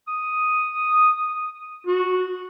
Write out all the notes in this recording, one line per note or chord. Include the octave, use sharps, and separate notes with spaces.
D#6
F#4